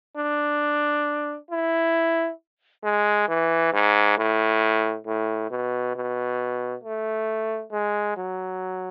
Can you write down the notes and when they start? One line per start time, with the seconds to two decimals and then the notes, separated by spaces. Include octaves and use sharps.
0.17 D4
1.51 E4
2.84 G#3
3.28 E3
3.73 G#2
4.17 A2
5.06 A2
5.50 B2
5.95 B2
6.84 A3
7.72 G#3
8.17 F#3